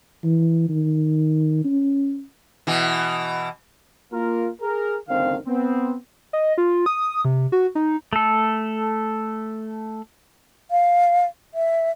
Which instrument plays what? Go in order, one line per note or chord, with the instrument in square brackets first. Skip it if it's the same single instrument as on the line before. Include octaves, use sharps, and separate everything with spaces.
[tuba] E3
D#3
C#4
[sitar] B2 E3
[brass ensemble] A#3 F4 A#4
G#4 A#4
F#1 C#2 D3 D#3 C4 F5
B3 C4
[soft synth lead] D#5
F4
D#6
C3
F#4
D#4
[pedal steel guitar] A3 A4
[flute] F5
E5